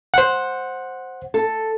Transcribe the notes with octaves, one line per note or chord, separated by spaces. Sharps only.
C5 F#5
A4